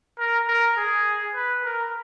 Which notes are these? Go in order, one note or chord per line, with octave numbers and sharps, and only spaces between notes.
A#4
A#4
G#4
B4
A#4